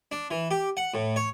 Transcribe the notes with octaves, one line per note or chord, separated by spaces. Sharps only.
D4
E3
G4
F#5
A2
C#5